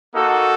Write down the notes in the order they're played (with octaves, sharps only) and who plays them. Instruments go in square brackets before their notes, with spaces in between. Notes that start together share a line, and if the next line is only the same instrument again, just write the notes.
[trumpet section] A#3 D#4 F#4 A4